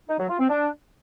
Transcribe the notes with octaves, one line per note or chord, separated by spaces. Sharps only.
D#4
F#3
F4
C4
D4